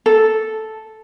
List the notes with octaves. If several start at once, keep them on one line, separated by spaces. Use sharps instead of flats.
A4